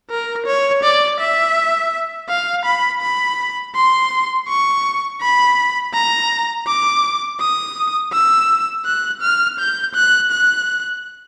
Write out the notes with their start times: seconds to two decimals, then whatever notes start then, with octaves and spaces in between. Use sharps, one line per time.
0.10 A#4
0.46 C#5
0.83 D5
1.20 E5
2.29 F5
2.66 B5
3.02 B5
3.75 C6
4.48 C#6
5.21 B5
5.94 A#5
6.67 D6
7.40 D#6
8.13 E6
8.86 F#6
9.22 F6
9.59 G6
9.95 F#6
10.31 F#6